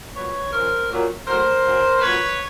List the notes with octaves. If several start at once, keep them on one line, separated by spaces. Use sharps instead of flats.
A#2 F#3 B4 C#5
C#3 F3 A#4 C5
A#2 F#3
A2 F#3 A#4 C5
C#3 F#3
A#2 F#3 B4 C#5